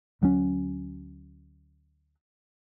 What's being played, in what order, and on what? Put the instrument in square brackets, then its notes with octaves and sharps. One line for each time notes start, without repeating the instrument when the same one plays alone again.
[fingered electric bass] D2 F#3 G3 C#4